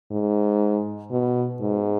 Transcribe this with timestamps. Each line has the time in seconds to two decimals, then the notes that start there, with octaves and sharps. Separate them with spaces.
0.11 G#2
1.11 B2
1.61 G#2